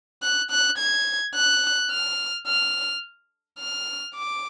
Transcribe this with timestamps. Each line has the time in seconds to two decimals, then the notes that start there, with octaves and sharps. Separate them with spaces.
0.23 F#6
0.51 F#6
0.78 G#6
1.35 F#6
1.91 F6
2.47 F6
3.59 F6
4.15 D6